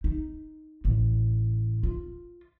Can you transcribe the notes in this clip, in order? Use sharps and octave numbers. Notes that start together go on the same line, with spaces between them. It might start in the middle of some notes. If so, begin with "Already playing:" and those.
D#4
A1
F4